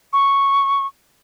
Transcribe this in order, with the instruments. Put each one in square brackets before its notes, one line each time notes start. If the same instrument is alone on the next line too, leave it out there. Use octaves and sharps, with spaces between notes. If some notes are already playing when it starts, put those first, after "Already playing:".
[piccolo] C#6